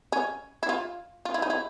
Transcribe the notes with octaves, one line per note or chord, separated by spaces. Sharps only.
C#4
E4
F4
F4
E4
D#4
E4